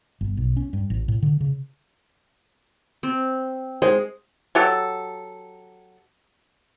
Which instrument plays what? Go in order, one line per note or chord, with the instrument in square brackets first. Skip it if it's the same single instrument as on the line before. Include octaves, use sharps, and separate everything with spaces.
[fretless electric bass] G1
B1
C#4
G2
A1
A2
D3
C#3
[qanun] C4
[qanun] G#3 [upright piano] C5
[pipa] F#3 G4 A4